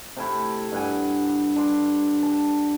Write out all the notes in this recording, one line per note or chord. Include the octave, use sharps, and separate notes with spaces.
C3 A3 E4
G2 F#5 G#5
D4 C6
A5